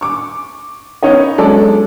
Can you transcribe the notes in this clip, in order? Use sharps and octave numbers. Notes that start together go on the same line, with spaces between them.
C#6 D6
B3 C#4 D#4 C#5 D#5
F#3 G#3 C#4 D4 A4 D5